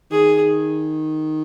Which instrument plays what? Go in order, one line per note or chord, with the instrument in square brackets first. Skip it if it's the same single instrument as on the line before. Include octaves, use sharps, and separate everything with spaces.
[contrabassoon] D#3 [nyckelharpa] G#4